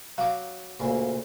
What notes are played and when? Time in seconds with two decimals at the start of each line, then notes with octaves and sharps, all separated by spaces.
0.18 F#3 F5 D6
0.80 D2 A#2 C#3